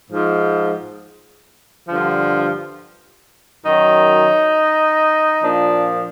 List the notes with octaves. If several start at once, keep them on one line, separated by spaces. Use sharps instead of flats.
G#2 F3
G2 D3 F3
F#2 D#3 F#3 D#4
A#2 F3 D4